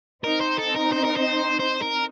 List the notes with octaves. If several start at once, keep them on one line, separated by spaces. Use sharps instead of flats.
C4 D#4 A#4
C5
A4
A#4
C5
A#4
C5
C5
A#4